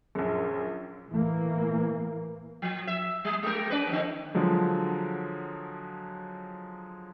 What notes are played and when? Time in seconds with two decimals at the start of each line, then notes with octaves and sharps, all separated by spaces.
0.15 A#1 F#2 G#4
1.09 A2 E3 A#3
2.62 F3
2.87 E5
3.25 G3
3.43 G#3 G4 A#4
3.70 C#4 B4
3.87 F2 G#2 D3
4.35 D3 F3 F#3 G#3